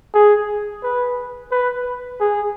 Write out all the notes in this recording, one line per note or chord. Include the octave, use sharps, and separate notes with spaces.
G#4
B4
B4
G#4